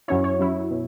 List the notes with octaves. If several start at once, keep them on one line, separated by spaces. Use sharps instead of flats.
F#2 F#3 C#4 E4 C#5
C#5
F#2 F#3 E4
B2